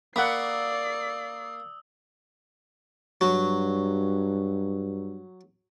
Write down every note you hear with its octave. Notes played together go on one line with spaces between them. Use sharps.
A#3 D5 F#5 B5 D#6 E6 C7
G2 F#3